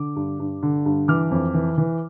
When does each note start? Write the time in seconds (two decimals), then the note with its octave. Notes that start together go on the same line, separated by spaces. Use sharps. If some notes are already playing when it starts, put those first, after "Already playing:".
Already playing: D3 D6
0.16 G2
0.40 G2
0.63 D3
0.86 G2
1.08 E3 D6 F6
1.31 F2
1.54 E3
1.78 E3